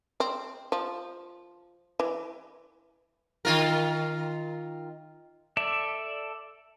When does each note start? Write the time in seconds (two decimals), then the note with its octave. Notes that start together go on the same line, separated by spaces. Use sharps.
0.20 C4
0.72 F3
2.00 E3
3.45 D#3 F4 A#4
5.57 A4 D5 E5